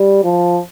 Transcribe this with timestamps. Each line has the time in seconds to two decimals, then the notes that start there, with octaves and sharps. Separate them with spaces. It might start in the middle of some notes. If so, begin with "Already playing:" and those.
Already playing: G3
0.24 F3